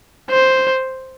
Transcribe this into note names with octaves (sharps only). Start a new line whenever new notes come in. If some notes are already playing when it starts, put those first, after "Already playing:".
C5